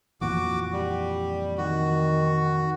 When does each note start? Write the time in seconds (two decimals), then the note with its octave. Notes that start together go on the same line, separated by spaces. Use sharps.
0.21 F2 A#2 E3 F#4 D6
0.73 G3
1.57 D#3 F#4